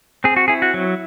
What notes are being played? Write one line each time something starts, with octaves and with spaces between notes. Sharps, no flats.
C4 G#4
F#4
E4 G#4
F#4
F#3